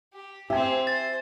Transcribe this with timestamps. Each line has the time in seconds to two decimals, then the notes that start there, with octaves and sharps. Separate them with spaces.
0.13 G4
0.50 C4 G4 C5 E5 G#5
0.87 C5 A6